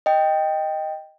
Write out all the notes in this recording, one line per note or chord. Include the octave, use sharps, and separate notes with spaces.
D#5 G5